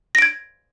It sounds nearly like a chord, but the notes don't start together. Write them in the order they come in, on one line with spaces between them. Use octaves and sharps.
A#6 D7 G#6